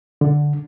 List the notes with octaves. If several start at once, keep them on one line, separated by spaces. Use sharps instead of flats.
D3